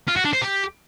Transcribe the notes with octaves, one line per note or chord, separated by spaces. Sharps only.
F4
F#4
D4
C5
G4